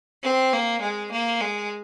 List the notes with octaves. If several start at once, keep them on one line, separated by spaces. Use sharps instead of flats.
C4
A#3
G#3
A#3
G#3